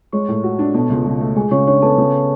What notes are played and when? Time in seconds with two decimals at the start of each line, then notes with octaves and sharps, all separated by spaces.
0.13 G#3 C#5 C#6
0.28 A2
0.44 F#4
0.59 D4
0.74 B2 A4 A5
0.90 C#2
1.06 C#2
1.21 A3
1.36 G#3 G#4 G#5
1.51 C#3 C#5 C#6
1.67 D4 C#5 C#6
1.82 B3 A4 A5
1.98 C#3